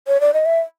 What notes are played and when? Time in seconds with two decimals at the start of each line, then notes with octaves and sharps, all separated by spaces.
0.07 C#5
0.21 D5
0.34 D#5
0.46 E5